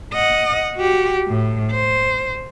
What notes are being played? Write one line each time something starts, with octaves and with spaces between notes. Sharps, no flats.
D#5 F#5
F#4 G4
A2
C5